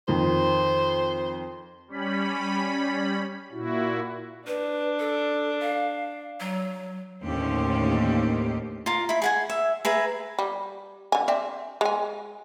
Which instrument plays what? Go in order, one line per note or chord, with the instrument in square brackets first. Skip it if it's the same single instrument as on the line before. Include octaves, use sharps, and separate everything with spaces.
[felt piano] F2 D#3 [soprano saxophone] C5
[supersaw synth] G3 C#4 B5
[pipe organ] A#2 E4 F#4
[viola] D4 [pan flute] B4
[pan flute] A4
F5
F#3
[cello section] D#2 A2 D3 C#4 G4 C5
[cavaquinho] F4 A#4
E4 B5
G#4 F#5 G#5
E5
G#4 B4 E5 A#5
[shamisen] G3
D3 G#5
C4 D5 E5
G#3 G#5